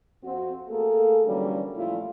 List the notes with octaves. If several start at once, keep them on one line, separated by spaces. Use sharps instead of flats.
F2 C4 F#4
A3 A#3 G#4 A4
D3 E3 F#3 G3 A#3 C#4
A#2 F3 G3 A3 E4 F4